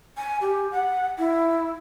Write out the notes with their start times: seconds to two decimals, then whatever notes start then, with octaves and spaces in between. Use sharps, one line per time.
0.17 G#5
0.41 G4
0.71 F#5
1.19 E4